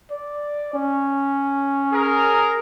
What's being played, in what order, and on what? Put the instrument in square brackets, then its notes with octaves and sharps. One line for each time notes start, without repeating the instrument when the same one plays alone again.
[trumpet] D5
C#4
[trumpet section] G#4 A#4